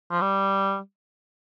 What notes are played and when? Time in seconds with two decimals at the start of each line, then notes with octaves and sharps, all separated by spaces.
0.11 F3
0.21 G3